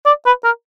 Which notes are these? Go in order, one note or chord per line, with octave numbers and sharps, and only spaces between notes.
D5
B4
A#4